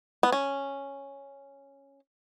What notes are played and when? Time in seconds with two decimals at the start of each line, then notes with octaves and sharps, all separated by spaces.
0.23 B3
0.32 C#4